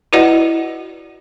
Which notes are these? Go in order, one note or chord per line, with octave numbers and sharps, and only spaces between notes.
E4 F#4 B4 D5 D#5 F#5